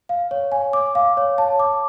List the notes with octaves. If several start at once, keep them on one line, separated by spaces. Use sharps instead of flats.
F5
C#5
G#5
D6
F5
C#5
A5
D6